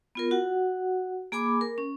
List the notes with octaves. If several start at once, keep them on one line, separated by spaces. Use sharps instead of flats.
B3 F4 A#4
F#4 F#5
A#3 G#4 G#5 B5 D6
A#4
C#4